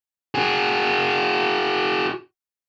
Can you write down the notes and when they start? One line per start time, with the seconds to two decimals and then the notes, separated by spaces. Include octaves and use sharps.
0.35 F#4 G#4